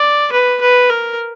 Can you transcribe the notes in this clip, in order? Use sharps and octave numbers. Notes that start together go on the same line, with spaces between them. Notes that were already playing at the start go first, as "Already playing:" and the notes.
Already playing: D5
B4
B4
A#4